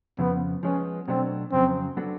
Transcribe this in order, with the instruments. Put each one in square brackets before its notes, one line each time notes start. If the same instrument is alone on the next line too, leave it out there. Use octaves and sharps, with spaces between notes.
[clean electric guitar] F2 C#3 F3 [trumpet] B3
[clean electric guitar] F3 G#3 B3 [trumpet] C#4
[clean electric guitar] B2 F#3 A3 D4 [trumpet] C4
[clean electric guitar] F2 C#3 F#3 [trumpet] C4
[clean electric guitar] F#3 B3 D4 F#4 A4